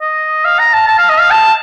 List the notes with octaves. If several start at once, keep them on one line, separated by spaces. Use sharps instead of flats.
D#5
F5
A#5
A5
A5
F5
D#5
F5
A5